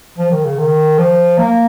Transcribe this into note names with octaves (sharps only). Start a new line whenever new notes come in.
F3
D#3
C#3
D#3
F3
A#3